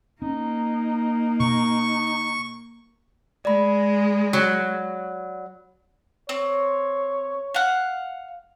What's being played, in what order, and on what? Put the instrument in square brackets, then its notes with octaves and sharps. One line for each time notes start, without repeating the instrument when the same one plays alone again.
[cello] A#3 [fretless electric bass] C#4 [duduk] D#4
[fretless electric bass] B2 [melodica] C#6
[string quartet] G#3 [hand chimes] D5 B5
[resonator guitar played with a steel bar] F#3
[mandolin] C4 [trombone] C#5
[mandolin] F5 F#5